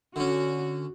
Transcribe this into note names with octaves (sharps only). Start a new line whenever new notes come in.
D3 C#4 F#4